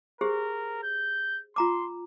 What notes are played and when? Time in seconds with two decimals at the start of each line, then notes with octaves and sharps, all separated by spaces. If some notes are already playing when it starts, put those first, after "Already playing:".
0.21 G4 G#4 A#4 C5
0.84 G6
1.56 F4 A#5 C6 D6